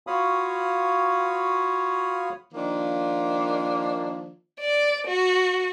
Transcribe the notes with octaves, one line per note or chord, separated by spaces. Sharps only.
F4 F#4 C#5 F5 B5 D#6
D#3 F3 A#3 D4 D#4 F4
D5
F#4